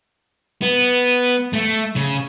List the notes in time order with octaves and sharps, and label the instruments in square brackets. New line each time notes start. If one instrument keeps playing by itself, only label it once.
[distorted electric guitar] B3
A3
C#3